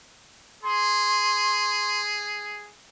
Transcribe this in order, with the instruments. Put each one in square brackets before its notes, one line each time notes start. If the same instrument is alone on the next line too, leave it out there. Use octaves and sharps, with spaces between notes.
[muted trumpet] G#4 [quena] C6